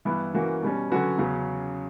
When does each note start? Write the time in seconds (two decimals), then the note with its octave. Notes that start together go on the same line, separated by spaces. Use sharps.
0.05 G2 E3 B3 E4
0.34 E3 A#3 C#4 F#4
0.62 B2 G3 C#4
0.90 D3 F#3 C#4 F#4 B4
1.18 E2 C#3 F#3 C#4